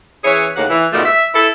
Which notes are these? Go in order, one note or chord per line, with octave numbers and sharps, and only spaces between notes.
E3 C#4 E4 G#4 C#5
D#2 A2 C#3 A#3 F#5
E3
G#2 B2 D#3 G3 A3 F4
E5
E4 A4